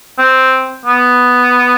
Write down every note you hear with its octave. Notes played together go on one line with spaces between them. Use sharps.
C4
B3